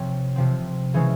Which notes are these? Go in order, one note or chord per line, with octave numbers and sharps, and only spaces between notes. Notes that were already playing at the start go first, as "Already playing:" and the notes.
Already playing: C3 F3 C4 C#5
C3 F3 C4
C#3 E3 G#3 C#4 C5